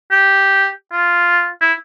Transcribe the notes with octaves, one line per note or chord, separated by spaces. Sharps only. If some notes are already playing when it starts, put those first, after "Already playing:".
G4
F4
E4